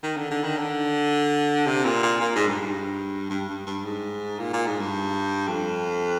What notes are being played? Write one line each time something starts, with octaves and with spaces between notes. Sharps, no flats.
D#3
D3
D3
D#3
D3
C3
A#2
A#2
A#2
G#2
G2
G2
G2
G2
G2
G#2
A#2
A#2
G#2
G2
F2